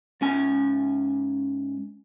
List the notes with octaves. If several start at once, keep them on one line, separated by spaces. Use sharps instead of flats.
G#2 C#4 G#5